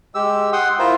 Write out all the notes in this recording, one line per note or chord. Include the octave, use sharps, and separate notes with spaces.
G#3 G4 E6
F#5 G5 C6 D#6
E4 F4 A#4 C5